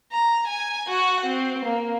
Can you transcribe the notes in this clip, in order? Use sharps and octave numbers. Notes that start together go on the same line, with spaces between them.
A#5
G#5
F#4 F#5
C4
A#3